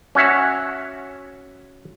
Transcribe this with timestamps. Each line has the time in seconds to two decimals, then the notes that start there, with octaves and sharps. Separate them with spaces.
0.15 C#4 F#4 C#5 E5 F#5